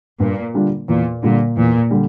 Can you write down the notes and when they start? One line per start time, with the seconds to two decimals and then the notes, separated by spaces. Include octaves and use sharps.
0.20 G2 A#2
0.54 D3 G3 D4 F4
0.88 E2 A#2
1.22 A#2 D3 G3
1.57 E2 A#2
1.91 D3 G3